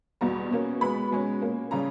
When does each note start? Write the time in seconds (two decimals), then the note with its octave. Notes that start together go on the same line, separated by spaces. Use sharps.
0.21 E2 B2 G3 A#5
0.51 B2 A#3 C#4
0.81 B2 G#3 B3 B5
1.11 B2 G#3 C#4
1.41 A#2 A#3 C#4
1.71 C#3 G3 C#4 A#5